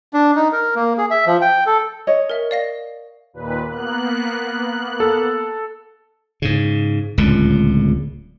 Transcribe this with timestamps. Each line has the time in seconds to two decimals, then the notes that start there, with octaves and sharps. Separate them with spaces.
0.13 D4
0.36 D#4
0.52 A#4
0.75 A#3
0.98 G#4
1.11 E5
1.27 F3
1.42 G5
1.66 A4
2.07 C#5 D#5
2.30 A#4 E5
2.51 D5 F5 A#6
3.33 D#2 A#2 B4
3.68 A#3 B3 F#6
5.00 A4
6.42 G#2 C#3
7.18 D1 C#2 A#2